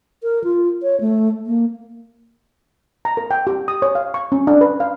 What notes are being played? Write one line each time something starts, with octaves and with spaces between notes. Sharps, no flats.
A#4
F4
C#5
A3
A#3
A#5
A#4
G5
G4
D#6
C#5
F5
C#6
C#4
D4
B4
F5